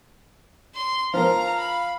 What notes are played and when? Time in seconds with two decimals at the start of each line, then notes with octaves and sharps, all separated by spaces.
0.74 C6
1.14 F3 A#4 F5 A#5
1.58 B5